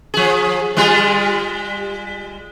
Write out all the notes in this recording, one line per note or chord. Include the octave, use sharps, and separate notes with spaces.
F3 G#4
G3 G#3 F4